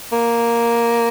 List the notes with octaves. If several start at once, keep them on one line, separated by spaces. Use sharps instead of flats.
A#3